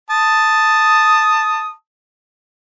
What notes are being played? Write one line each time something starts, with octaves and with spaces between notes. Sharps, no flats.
A5 D#6